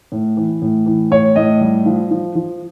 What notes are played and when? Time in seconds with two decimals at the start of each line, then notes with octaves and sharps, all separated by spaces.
0.12 A2
0.37 E3
0.62 A2
0.86 E3
1.11 A2 C#5
1.36 A2 D#5
1.61 G3
1.85 F3
2.11 F3
2.35 F3